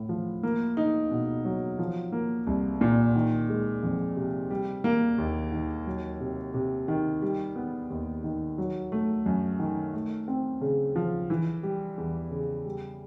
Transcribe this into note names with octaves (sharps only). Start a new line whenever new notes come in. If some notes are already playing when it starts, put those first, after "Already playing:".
Already playing: A2
F3
A#3
D#4
B2
F#3
F3
A#3
C2
A#2
D#3
G#3
F2
C3
G3
A#3
D#2
D#3
F#3
C3
C3
D#3
G3
B3
D#2
D#3
F#3
A3
F#2
D#3
A3
C4
C#3
F3
E3
G3
E2
C#3
G3